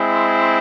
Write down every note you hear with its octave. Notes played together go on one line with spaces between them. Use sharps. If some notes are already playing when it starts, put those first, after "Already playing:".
Already playing: G#3 C4 E4